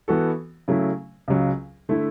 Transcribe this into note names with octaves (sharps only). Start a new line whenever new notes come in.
E3 B3 F#4 A4
C#3 F#3 A3 E4
C#2 C#3 F#3
D3 A3 E4